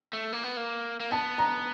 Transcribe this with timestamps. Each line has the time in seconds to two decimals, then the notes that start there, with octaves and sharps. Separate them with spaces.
0.13 A3
0.33 A#3
0.44 B3
0.57 A#3
1.00 A#3
1.11 B3 A5
1.38 A#5